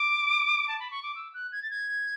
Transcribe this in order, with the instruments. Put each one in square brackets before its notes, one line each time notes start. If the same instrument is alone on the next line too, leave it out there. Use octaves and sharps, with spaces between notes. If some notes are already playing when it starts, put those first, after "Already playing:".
Already playing: [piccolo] D6
A5
B5
C#6
D6
E6
F#6
G#6
A6
G#6